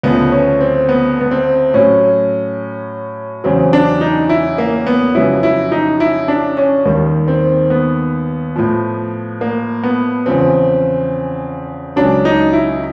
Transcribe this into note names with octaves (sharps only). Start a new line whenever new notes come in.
D2 C#3 F3 B3
C#4
C4
B3
B3
C4
A2 F#3 C#4
E2 C#3 F#3 C4
D4
D#4
E4
A#3
B3
F2 C#3 F#3 E4
E4
D#4
E4
D4
C#4
D#2 D#3 G3
C4
B3
A2 F3
A#3
B3
E2 C#3 F3 C4
C#2 C#3 F#3 D4
D#4
E4